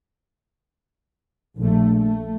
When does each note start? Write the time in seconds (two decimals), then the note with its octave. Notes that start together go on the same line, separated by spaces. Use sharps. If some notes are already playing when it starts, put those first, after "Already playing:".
1.58 A#1 A3
1.96 A3